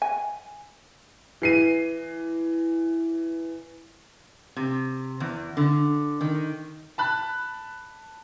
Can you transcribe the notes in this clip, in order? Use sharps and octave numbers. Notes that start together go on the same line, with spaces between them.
G#5
E3 C7 D#7
C3
E2
D3
D#3
A5 B5 F#6